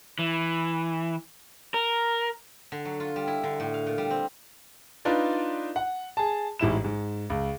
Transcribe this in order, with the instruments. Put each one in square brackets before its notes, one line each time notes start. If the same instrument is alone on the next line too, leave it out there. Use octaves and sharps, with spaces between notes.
[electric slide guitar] E3
A#4
[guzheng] D3
F#3
F4
G3
E4
D3
A2
F5
A#2
G3
C4
[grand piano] D4 D#4 F4 B4 D5
F#5
G#4 A5
A1 G#2 E4 E7
G#2
C#2